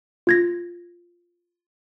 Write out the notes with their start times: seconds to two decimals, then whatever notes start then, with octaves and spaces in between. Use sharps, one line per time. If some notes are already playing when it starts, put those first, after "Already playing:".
0.27 F4 G#6 A#6